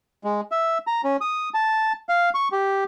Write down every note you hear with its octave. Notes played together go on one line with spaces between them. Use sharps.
G#3
E5
A#5
C#4
D#6
A5
F5
C#6
G4